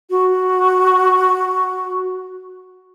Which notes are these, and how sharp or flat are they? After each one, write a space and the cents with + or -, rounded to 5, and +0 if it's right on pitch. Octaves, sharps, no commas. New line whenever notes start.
F#4 +0